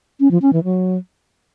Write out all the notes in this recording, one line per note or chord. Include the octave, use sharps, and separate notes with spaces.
C#4
F3
C#4
E3
F#3